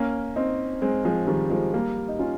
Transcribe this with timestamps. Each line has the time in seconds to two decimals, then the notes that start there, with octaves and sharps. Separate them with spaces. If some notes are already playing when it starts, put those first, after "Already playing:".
Already playing: A#3 C#4
0.36 C4 D#4
0.82 G#3 C4
1.05 F3 G#3
1.27 D#3 G3
1.50 F3 G#3
1.74 G3 A#3
2.09 D#4
2.19 C#4 F4